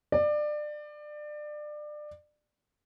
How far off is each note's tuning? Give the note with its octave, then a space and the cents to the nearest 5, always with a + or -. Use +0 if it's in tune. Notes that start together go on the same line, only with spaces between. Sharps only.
D5 +25